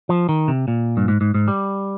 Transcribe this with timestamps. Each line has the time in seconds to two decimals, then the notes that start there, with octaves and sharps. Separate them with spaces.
0.09 F3
0.29 D#3
0.48 C3
0.68 A#2
0.97 G2
1.08 G#2
1.21 G#2
1.34 G#2
1.48 G3